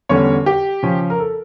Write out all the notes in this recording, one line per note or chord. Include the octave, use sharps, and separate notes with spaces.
E2 D3 G3 C#4 C#5
G4
C#3 F3 C#4
A#4
A4